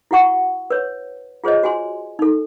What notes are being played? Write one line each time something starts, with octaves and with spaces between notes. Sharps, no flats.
E4 F#4 F#5 C#6
B4 C#5
F4 G#4 C5 C#5 D#5
F#4 G#5 C6
D#4 A4